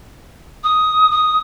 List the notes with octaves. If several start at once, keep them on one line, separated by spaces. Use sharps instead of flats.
D#6
D#6